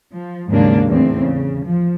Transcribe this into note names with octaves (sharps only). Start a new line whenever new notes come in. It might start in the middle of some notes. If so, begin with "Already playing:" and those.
F3
D#2 G#2 C#3 F#3 A#3 D4
E2 A2 C4
C#3
F3